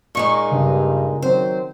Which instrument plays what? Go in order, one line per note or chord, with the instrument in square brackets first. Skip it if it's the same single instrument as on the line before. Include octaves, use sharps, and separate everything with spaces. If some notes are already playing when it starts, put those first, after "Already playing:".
[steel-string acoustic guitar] A#2 G#3 D#4 [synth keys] C#6 C#7
[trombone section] G2 [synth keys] C#3
[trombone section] D#3 F#3 C4 [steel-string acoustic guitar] C5